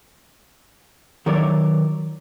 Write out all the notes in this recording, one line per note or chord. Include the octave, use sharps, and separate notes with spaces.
D#3 F#3 E4 A#4 C#5 D5